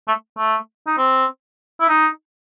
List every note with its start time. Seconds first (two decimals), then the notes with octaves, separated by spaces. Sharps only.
0.08 A3
0.37 A3
0.87 D#4
0.98 C4
1.80 E4
1.88 D#4